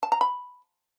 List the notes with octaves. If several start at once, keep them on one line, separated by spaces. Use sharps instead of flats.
A5
A#5
B5